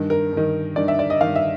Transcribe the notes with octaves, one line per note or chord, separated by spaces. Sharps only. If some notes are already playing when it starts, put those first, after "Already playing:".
Already playing: G2 D#3
A#4
G2 D#3
G2 D#3 D5
E5
D5
D#5
G2 D#3 F5
E5